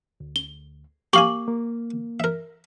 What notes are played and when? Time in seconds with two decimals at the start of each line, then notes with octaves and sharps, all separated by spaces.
0.20 D2
0.36 G7
1.13 A#3 G4 F5 G#5 C#6 D6 F#7
1.48 A#3
2.20 A#4 E5